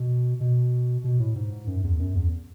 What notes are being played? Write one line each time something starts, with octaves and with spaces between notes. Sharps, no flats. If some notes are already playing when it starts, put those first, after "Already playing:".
Already playing: B2
B2
B2
A2
G#2
F#2
E2
F#2
E2